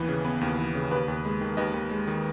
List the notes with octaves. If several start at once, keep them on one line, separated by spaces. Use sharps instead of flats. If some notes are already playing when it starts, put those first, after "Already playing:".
Already playing: D#2 E3 B3 B4
C#3
B3 B4
D#2
E3
C#3
D#2 B4
D#2
G#3
D#3
D#2 B4 D#5
D#2
G#3
D#3